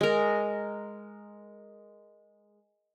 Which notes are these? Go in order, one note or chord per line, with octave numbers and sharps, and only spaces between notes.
G#3 A#4